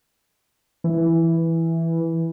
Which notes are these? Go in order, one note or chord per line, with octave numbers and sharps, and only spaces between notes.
E3